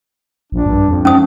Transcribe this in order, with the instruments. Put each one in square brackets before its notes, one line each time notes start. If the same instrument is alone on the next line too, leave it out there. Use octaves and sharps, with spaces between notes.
[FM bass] A#1 [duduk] D4
[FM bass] G2
F2
[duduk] F3 [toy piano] C#4 D#6